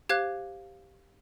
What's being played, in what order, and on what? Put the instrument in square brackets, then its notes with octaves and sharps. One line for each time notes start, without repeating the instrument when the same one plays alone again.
[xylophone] G4 C5 F5 F#6 G#6